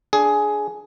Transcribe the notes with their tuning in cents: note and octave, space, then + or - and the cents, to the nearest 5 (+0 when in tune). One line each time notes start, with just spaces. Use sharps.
D4 +0 G#4 +10